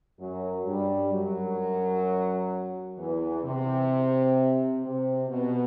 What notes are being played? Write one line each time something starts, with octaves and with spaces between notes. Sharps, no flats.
F#2 F#3
G2 G3
F#2 F#3
E2 E3
C3
C3
B2